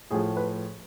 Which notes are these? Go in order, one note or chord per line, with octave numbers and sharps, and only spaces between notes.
A2 F3 G#4
B4